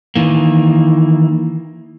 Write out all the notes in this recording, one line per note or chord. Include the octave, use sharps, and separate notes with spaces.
D#3 E3 A#3